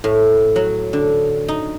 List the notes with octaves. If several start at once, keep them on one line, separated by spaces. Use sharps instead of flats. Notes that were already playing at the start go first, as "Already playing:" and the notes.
A2
F#3
D3
D#4